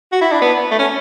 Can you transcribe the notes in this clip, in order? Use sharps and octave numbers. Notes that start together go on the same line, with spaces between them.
F#4
E4
D4
B3
A3
C#4